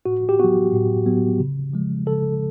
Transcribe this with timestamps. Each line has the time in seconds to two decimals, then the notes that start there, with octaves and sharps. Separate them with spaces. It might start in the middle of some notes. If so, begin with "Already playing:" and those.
0.06 A2 F#4
0.29 G4
0.39 F#3 B3 F#4
0.73 A2
1.06 F#3 B3
1.39 C#3
1.73 F3 G#3
2.06 C#3 A4